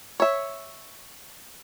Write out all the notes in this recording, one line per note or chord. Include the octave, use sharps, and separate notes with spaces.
C#5 E5